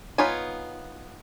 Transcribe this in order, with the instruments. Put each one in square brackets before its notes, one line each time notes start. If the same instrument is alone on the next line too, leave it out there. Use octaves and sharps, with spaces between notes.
[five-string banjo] B3 D#4 F4 C#5 G#5